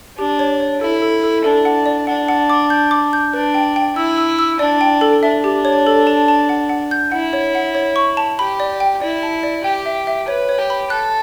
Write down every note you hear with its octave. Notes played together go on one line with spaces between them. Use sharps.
D4 G4
C#5
C#5
E4 A4
A4
A4
D4 A4
F#5
D5
D4 F#5
F#5
D6
G6
D6
G6
D4 B4
G5
G5
E4 E6
E6
E6
D4 D5
G5
A4
D4 E5
G4
C#5
A4
A5
A5
F#5
F#5
G6
E4 F#5
C#5
F#5
C#5
C#6
A5
G4 B5
D5
G5
E4 D5
A5
D5
G4 G5
E5
E5
B4 C#5
C#5
G4
B5
A4 F#6